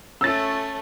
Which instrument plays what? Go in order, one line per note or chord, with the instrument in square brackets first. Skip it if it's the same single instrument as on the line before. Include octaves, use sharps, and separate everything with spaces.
[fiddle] A3 C#4 [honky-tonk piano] E6 A6